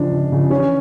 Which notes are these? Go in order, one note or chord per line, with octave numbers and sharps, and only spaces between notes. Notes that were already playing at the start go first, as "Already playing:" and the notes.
Already playing: C#2 C#3 F3 D4
C#2
C#3 F3
E3 C#4